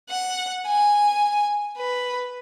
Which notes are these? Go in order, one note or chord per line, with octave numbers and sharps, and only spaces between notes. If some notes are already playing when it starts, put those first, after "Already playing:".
F#5
G#5
B4